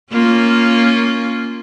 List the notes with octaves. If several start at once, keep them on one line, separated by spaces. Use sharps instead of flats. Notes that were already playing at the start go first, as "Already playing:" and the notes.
A#3 C#4 F4